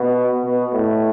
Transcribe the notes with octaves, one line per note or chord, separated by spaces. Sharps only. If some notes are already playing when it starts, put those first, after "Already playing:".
Already playing: B2
B2
A2